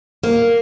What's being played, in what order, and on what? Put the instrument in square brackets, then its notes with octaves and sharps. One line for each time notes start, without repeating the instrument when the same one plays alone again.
[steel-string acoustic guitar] A#3